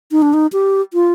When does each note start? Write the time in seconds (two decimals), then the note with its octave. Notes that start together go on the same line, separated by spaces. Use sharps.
0.12 D#4
0.22 D4
0.34 D#4
0.53 G4
0.93 F4